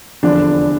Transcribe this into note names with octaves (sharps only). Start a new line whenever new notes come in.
F1 E2 D3 F3 D4